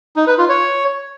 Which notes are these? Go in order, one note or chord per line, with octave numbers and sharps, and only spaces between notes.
D#4
B4
F4
C#5